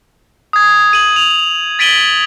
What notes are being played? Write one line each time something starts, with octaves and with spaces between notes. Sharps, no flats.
D#6 G#6
D#7 F#7
F7
A6 B6 D7 D#7 F#7 G7